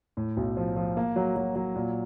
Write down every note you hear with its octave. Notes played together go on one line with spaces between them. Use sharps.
A2
B1
F3
F3
A#3
F#3
F#3
F#3
A#2